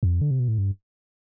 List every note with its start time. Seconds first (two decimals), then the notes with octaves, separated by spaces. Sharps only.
0.03 F2
0.21 D3
0.31 C3
0.40 B2
0.48 A2
0.58 G2